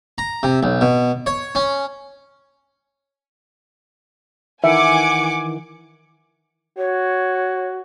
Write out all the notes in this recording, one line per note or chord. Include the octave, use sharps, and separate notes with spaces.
A#5
C3
B1
B2
C#5
C#4
D#3 E3 E4 E5 F#5 G#5 D6 C#7
F#4 C#5